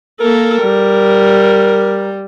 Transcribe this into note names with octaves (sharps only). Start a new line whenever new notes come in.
A#3 A4 A#4
G3